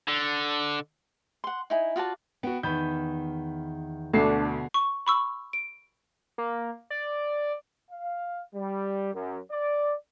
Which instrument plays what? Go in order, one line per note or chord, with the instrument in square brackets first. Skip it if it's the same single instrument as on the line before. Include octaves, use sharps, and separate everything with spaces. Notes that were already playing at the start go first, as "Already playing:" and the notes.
[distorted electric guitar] D3
[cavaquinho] F#5 C6
D#4 E4 G#5
F4 F#4 D5 A5
[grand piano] B3 F#4 [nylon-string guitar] G5
[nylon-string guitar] E2 D#3 [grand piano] B5 G6
[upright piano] D2 C7 [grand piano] B2 D3 [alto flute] D4 [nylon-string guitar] A4
[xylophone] C#6
B5 C#6 E6
D7
[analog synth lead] A#3
D5
[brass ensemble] F5
G3
F#2
D5